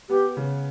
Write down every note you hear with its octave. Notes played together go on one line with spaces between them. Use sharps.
B3 G4
C#3